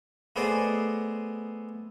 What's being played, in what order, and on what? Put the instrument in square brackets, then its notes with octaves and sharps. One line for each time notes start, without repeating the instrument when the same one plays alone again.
[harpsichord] A3 B3 G#4 C5 D5 D#5